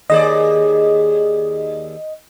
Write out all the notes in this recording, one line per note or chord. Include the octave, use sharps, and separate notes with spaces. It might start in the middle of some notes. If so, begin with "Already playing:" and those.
D#2 G#4 D5 D#5